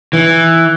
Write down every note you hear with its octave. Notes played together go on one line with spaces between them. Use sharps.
E3